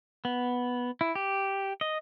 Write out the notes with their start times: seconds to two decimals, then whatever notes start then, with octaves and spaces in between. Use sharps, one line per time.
0.25 B3
1.01 E4
1.15 G4
1.81 D#5